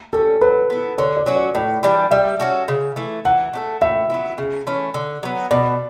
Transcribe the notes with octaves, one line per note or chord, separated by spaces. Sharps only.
G3 C#4 A4
F#3 B4
B3 E4
D3 C#5
D5
F#3 C#4 F#4
D5
A2 D5
E3 G3 D4
G3 E5
C#4 F#4 A4
C#3
E3 A3
E3 F#5
A3 D4 A4
A2 E5
F#3 B3 E4
C#3
E3 A3 C#4
D3
F#3 B3
B2 D5